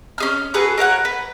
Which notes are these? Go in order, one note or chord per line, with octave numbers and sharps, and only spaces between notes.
C#4 G#4 F6
F#4 G#4 A4 B4
A#4 C#5 F5 F#5
B4